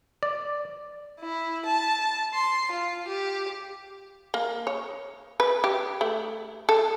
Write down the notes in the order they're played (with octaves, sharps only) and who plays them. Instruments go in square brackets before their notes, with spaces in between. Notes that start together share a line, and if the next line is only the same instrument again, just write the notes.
[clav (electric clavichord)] D5
[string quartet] E4
A5
C6
F4
G4
[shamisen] A#3
C#5
B4
G4
A3
A4